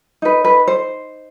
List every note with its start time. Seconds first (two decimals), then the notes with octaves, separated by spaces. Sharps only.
0.22 D#4 B4
0.45 B4
0.68 C5